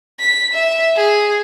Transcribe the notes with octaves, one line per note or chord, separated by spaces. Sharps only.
B6
E5
G#4